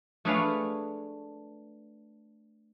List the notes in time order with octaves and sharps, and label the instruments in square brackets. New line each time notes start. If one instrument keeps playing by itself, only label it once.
[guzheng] A3 D4 G#4 B4 C#5 F5